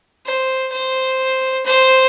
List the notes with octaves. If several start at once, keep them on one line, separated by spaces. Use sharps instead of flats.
C5
C5
C5